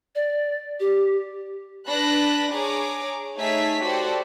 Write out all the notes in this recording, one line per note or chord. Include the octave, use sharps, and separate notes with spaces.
D5
G4
D4 B4 B5 F#6 A#6
G#4 C#5 A#5 D6
A3 D#4 G#4 C#5 E5 B6
F#4 G4 A4 C5 D5